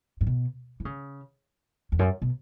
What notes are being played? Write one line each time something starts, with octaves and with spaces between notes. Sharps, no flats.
G#2
B2
E3
C#3
E2
F#2
B2